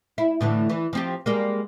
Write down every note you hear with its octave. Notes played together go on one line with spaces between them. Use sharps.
E4
A2 D3 E3
E3
F3 C4 G4
G3 G#3 A#3